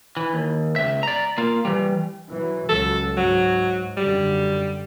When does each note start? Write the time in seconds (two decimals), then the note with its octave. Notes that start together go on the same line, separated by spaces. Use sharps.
0.17 E3
0.34 D#2
0.76 C#2 E5
1.03 D5 A#5
1.38 A#3 F4
1.65 E3 G3
2.30 E3 F#3
2.69 C#2 F#3 A4
3.17 G#2 F#3
3.97 F#2 D3 G3